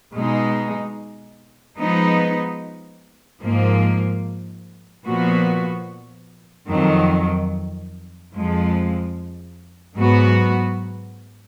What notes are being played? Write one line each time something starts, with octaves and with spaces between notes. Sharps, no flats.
B2 G#3 D#4
F3 G#3 B3 D#4
G#2 F3 A#3
A#2 F3 B3 F#4
F2 D#3 F#3
F2 F3 G#3
G#2 F#3 B3 F#4